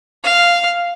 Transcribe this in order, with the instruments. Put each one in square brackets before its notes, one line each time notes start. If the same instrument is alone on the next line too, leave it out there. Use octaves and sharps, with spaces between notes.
[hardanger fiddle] F5